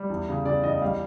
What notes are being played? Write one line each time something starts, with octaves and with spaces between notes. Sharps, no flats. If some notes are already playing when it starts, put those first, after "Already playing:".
Already playing: G3
E2
C#3
C#3 D5
E2 D#5
G3 F5